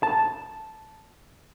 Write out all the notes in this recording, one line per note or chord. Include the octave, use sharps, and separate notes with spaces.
A5